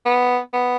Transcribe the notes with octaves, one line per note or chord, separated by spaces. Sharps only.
B3
B3